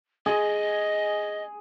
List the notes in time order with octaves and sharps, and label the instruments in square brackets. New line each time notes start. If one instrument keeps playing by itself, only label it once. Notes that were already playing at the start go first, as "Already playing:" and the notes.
[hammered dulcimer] G#4 [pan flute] D#5